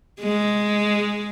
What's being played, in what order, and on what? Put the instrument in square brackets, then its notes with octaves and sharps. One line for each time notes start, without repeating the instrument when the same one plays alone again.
[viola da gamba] G#3